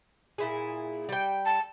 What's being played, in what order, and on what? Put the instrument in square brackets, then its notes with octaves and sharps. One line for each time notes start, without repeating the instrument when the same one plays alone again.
[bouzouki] A#2 E4 G#4
G3 G5
[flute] A5